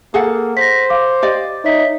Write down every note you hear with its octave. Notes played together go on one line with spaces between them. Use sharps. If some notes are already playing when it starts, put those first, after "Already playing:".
A#3 G#4 A4 F#5
C5 A#6 B6
F5 D6
G4 D5 D#5
D#4 C#5 E5 B6